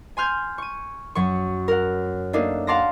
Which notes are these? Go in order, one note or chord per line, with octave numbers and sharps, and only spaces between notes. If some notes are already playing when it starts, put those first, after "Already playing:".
G#5 C6 F6 G6 G#6
C#6 D#7
F#2 F#3 C#6
A#4 F#5
A3 A#3 D4 D#4
F5 F#5 A5 C6 D6 A#6